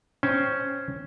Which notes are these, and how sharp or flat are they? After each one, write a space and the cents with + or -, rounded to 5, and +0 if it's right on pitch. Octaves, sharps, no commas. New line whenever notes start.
C#4 +0 C5 +0 G5 +0